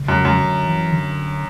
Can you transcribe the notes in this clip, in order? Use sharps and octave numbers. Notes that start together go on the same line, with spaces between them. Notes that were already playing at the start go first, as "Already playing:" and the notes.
Already playing: C#3
F#2
F#2
D3
E3
D3